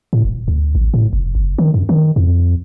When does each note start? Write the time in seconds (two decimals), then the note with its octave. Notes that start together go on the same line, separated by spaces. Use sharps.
0.13 A2
0.25 D#1
0.48 D2
0.75 A1
0.94 A2
1.13 F1
1.35 F#1
1.58 D#3
1.74 F#2
1.89 D#3
2.16 F2